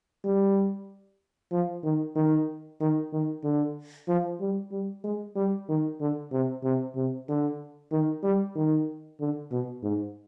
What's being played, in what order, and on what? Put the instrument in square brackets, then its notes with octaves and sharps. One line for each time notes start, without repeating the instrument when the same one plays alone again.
[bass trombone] G3
F3
D#3
D#3
D#3
D#3
D3
F3
G3
G3
G#3
G3
D#3
D3
C3
C3
C3
D3
D#3
G3
D#3
D3
B2
G#2